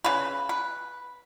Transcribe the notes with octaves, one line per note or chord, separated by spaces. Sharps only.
C#3 B4
B4